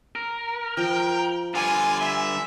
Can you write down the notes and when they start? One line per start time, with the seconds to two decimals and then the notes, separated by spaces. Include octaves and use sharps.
0.15 A#4
0.77 F3 G5
1.54 D3 G3 F4 G#5
2.01 E5